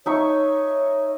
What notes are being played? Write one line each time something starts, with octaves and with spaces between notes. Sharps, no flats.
D#4 C#5 E5 C#6